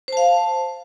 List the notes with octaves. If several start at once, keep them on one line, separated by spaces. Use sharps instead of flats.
C5 F5 A5